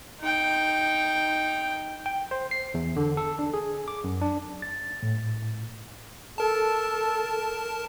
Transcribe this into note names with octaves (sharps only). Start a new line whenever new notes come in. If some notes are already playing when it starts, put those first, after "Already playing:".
D#4 G5
G5
C5
C7
E2
D3
A4
D4
G#4
D6
F#2
D4
A6
A2
A4 A#4 A5